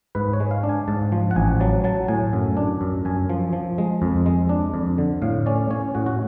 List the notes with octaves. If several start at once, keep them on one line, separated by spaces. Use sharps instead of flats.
G#2 B4
C#5
G#3
F5
D4
G#5
G#2 A5
F3
F#5
A1 G#5
F#3 A5
F#3 A5
A2 G#5
F#2
D4
F#2
F#2 G#5
F3
F3
G#3
F2
G#3
D4
F2
D3
A2 F5
C#4 D5
C#4 C#5
A2 F#4
F#4